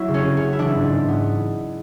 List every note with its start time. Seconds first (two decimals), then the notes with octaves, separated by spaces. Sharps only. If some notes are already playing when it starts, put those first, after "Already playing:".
Already playing: F#3 E4
0.08 C#3
0.14 C#4
0.26 C#3
0.37 C#4
0.42 B3
0.53 E4
0.59 E3 D4
0.75 G#2
0.93 G#2
1.08 B3